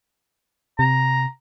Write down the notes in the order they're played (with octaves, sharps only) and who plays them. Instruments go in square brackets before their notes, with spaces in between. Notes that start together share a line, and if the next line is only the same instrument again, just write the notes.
[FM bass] C3 [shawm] A#5